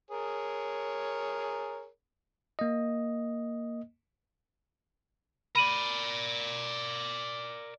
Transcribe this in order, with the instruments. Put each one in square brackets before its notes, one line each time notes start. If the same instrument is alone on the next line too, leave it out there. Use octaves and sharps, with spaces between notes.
[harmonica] G#4 A#4 C#5
[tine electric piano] A#3 D#5
[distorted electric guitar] A#4 D5 [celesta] B5 D#7 F#7